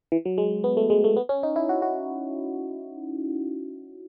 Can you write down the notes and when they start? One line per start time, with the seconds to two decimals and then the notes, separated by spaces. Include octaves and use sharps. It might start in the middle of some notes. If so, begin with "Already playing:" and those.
0.12 E3
0.25 F#3
0.38 G#3
0.64 B3
0.77 A3
0.90 G#3
1.04 A3
1.17 B3
1.29 C#4
1.43 D#4
1.56 E4
1.69 F#4
1.82 F#4